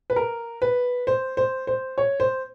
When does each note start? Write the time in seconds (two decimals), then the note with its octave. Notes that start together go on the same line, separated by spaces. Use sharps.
0.10 B4
0.16 A#4
0.62 B4
1.07 C5
1.37 C5
1.67 C5
1.98 C#5
2.20 C5